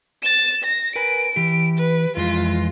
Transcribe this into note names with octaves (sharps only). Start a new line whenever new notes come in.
A6 E7
A#6
A#4 B4 G#5 D7
E3 G4
B4
F2 E3 G#3 F4